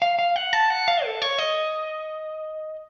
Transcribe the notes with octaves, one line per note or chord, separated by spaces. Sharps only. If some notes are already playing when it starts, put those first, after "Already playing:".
F5
F5
F#5
A5
F#5
F5
A4
C#5
D#5